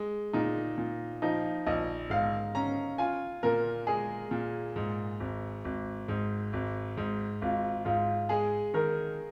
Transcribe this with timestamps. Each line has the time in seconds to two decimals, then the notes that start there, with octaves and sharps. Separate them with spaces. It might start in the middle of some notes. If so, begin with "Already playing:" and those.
Already playing: G#3
0.33 A#2 D#4
0.78 A#2
1.22 F3 D#4
1.66 A#1 D#5
2.10 G#2 F5
2.55 C#4 A#5
2.98 F4 G#5
3.43 A#2 A#4
3.87 G#3 G#4
4.31 A#2
4.76 G#2
5.20 G#1
5.65 G#1
6.08 G#2
6.53 G#1
6.97 G#2
7.42 G#1 F4
7.85 G#2 F4
8.29 G#3 G#4
8.74 D#3 A#4